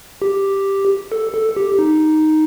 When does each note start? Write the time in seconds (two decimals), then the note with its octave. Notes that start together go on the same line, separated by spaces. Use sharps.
0.22 G4
1.12 A4
1.34 A4
1.56 G4
1.79 D#4